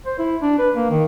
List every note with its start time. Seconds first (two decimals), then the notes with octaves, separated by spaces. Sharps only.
0.06 C5
0.19 E4
0.42 D4
0.59 B4
0.75 A#3
0.91 D#3